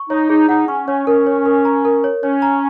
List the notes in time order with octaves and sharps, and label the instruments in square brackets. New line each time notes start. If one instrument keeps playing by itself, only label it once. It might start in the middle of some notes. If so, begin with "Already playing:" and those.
Already playing: [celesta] C#6
[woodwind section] D#4 [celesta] C#5
[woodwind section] D#4 [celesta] G#4
[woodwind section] D#4 [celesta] F#5
[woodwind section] C#4 [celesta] C#6
[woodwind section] C#4 [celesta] C#5
[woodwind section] C#4 [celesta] A#4
[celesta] C#5
A#4
A#5
A#4
C#5
[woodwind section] C#4 [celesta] C#5
[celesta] A#5